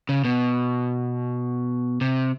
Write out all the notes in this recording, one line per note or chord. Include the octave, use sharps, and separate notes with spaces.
C#3
B2
C3